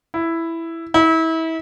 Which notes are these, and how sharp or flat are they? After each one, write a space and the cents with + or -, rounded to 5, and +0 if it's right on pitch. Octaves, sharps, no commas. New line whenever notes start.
E4 +5
E4 -30